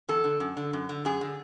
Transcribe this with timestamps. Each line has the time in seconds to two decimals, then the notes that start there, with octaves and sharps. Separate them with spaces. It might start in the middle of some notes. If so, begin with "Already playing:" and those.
0.09 E2 A4
0.24 D3
0.40 F#2
0.57 D3
0.73 F#2
0.89 D3
1.05 F#2 G#4
1.21 D3